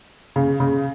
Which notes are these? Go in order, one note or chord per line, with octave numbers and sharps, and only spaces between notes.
C#3
C#3